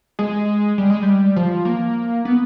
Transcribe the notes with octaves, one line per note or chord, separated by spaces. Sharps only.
G#3
G3
G#3
G3
F3
A#3
B3